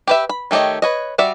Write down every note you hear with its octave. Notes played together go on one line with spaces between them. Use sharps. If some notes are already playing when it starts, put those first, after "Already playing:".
G4 B4 E5
B5
D#3 A3 G4 C#5 D#5
B4 C#5 D#5
G3 F#4 D5 E5